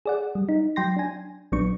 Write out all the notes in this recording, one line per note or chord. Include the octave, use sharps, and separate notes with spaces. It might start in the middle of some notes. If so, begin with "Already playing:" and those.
G#4 D5 F#5
G3
D#4
F#3 G5 C6 A#6
D4 G#5
A#1 F#3 B3 D4 C#6